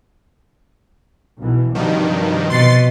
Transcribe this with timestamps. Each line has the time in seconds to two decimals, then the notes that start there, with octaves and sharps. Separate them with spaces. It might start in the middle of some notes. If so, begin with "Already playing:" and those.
1.39 B1 B2 E3
1.75 G2 C3 D#3 F3 F#3
2.50 B2 C6 A6 C7